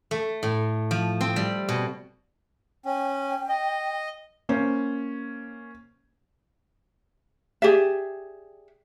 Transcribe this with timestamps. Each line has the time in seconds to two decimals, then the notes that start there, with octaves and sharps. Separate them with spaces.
0.11 A3
0.43 A2
0.91 F3
1.21 C4
1.36 G3
1.69 B2
2.85 C#4 G5
3.49 D#5
4.49 A#3 C#4 C5
7.62 G4 G#4 D5 E5